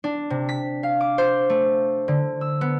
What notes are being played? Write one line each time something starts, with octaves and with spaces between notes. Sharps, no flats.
D4
C3
B6
F5
D6
C5
A3
D3
E6
B3